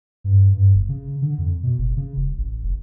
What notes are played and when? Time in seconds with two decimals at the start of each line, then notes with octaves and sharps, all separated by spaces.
0.24 G2
0.53 G2
0.74 G1
0.89 C#3
1.22 D3
1.38 F2
1.63 B2
1.78 F#1
1.97 C#3
2.16 E1
2.38 A1
2.63 F1